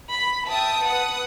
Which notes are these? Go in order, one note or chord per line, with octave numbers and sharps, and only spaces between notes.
B5
E5 G5 A5 D#6
B4 F#5 D#6